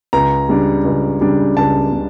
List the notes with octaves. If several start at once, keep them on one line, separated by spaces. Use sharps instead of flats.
C#2 A#5
C#3 G3 D4
C#2
C#3 G3 D4
C#2 A5
C#3